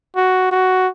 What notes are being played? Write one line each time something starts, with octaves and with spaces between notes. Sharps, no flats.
F#4
F#4